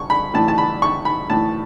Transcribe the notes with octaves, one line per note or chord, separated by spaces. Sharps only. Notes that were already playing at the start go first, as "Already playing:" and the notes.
Already playing: C#6
B5
A2 E3 A5
A5
B5
C#6
B5
A2 E3 A5